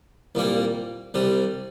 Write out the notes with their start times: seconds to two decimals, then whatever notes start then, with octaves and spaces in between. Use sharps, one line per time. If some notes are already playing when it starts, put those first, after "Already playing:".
0.35 C2 A#2 G3 A#3
1.14 C2 C3 G3